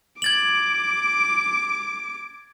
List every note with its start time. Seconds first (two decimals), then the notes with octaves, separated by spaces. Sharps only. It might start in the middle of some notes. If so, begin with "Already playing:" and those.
0.22 D6 G#6 A6 F#7